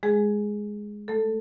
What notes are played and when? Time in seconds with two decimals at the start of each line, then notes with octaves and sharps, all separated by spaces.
0.03 G#3 G#4
1.08 A3 A4